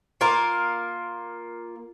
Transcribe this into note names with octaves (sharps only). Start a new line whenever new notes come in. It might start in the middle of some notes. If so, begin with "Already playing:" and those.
A#3 F4 A#4